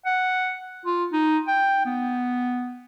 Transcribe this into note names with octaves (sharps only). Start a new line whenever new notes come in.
F#5
F4
D#4
G5
B3